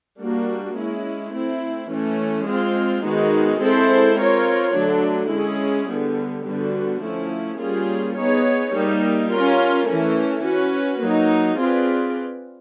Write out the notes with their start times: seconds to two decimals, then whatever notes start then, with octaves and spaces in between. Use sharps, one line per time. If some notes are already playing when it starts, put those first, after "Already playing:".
0.19 G3 A#3 D4 F#4
0.75 G#3 C#4 E4
1.33 A3 C4 E4
1.90 E3 A3 C#4
2.46 G#3 C4 F4
3.04 D#3 G#3 B3 D#4 F#4
3.61 G#3 C4 E4 A4 C5
4.17 C4 F4 A#4 C#5
4.74 D3 F#3 A3 D4
5.31 G#3 C#4 E4 G#4
5.88 D3 G3 B3
6.44 D3 G3 B3 D4 F#4
7.02 F3 A3 C#4 E4
7.59 G3 A#3 C#4 F4 G#4
8.16 B3 D#4 G#4 C#5
8.73 G3 A#3 D#4
9.30 C#4 F4 A#4
9.86 E3 A3 C#4
10.43 C#4 F#4 B4
11.00 F#3 A#3 D#4
11.57 C4 F4 G#4 B4 D5